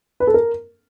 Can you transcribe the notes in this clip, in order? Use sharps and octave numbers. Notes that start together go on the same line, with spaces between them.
B4
A4
A#4